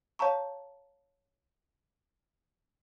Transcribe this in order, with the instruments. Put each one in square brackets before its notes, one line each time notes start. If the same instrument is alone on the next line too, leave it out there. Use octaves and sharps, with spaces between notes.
[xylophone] C#5 F5 A5 A#5 C#6